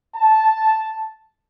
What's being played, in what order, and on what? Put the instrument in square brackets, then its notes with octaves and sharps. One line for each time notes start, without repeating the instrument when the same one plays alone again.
[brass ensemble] A5